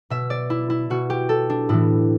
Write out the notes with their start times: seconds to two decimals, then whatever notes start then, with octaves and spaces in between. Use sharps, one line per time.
0.10 B2 E5
0.30 D5
0.50 E4
0.70 E4
0.90 B2 F#4
1.10 G4
1.29 A4
1.50 D4
1.69 A2 E3 E4